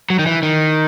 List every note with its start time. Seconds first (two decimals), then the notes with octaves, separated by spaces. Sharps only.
0.10 F#3
0.19 D#3
0.26 E3
0.43 D#3